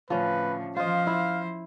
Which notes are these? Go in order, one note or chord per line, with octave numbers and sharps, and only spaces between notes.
A2 D3 F3 C#4 B4
F3 F4 C5 D#5 F5
E4